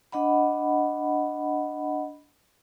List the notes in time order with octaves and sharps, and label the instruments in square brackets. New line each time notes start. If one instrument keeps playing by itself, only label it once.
[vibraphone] D4 D#5 F#5 B5